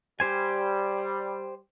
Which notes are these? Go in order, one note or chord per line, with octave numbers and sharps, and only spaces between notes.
G3 G4 C5 G#5